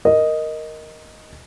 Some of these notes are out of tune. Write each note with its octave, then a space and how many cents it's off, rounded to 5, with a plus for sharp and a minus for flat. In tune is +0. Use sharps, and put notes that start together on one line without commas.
A#4 +0 D#5 +0